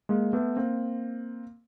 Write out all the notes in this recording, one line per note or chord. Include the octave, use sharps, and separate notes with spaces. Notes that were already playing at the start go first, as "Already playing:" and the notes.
G#3 A#3
A3 B3
A#3 C4